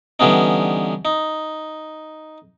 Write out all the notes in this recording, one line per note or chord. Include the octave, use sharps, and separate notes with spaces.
D3 E3 G3 B3 C#4 D#4
D#4